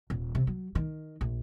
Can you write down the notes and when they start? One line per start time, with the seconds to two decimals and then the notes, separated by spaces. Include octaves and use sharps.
0.10 D#1
0.35 C3
0.47 F#3
0.75 D#3
1.21 A#1